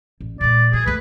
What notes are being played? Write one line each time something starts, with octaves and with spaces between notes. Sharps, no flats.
A1
A#2 G#3 D5
F#3 G#4
D2 A3 B4